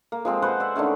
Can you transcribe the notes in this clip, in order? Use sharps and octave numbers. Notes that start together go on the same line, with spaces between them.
A#3
F3 G#3 C4
B4 C5 F#5 C6
D5 E5
D3 D#3 A3 C#4